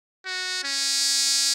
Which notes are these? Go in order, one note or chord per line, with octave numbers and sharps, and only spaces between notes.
F#4
C#4